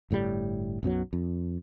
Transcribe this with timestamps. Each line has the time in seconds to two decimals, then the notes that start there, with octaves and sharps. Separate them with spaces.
0.11 G1 A2 C#3 G3
0.83 B1 F#2 B2 F#3
1.13 F2